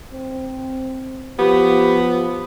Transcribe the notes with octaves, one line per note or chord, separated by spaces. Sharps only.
C4
F3 B3 G4